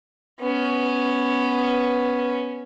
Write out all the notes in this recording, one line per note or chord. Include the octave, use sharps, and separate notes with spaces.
B3 C#4